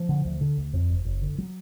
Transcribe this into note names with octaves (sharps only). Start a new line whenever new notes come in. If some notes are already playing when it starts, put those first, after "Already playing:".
Already playing: F3
D3
D2
D3
D2
F2
F#1
F#1
D3
F#3